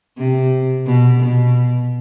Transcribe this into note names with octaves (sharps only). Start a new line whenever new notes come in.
C3
B2
B2